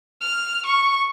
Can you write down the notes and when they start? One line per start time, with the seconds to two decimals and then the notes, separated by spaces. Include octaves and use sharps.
0.21 F6
0.66 C#6